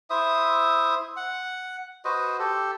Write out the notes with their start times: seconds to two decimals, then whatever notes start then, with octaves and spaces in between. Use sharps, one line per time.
0.10 E4 C5 E5 D#6
1.16 F#5
2.05 F#4 B4 C5 D#5
2.39 G4 A4